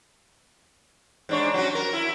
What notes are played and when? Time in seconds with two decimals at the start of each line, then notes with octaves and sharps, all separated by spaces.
1.29 G#2 D4 C#5
1.54 F#3 C#4 F#4
1.75 A#4
1.93 E4